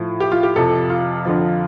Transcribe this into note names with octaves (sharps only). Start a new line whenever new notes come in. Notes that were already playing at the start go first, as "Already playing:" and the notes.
Already playing: A2 F3
G4
F4
G4
F2 C3 F3 A4
F4
F2 D3 F3